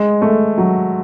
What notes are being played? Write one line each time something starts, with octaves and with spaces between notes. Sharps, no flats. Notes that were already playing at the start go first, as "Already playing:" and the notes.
Already playing: G#3
A3
F#3